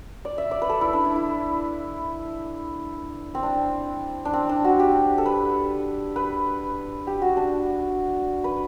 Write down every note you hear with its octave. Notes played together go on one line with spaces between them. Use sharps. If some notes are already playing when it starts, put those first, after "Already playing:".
D5
E5
D5
B4
A4
E4
D4
E4
E4
C4
D4
D4
C4
D4
F#4
G4
A4
B4
B4
G4
F#4
D4
B4